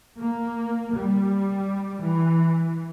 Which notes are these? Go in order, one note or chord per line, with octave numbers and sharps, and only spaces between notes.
A#3
G3
E3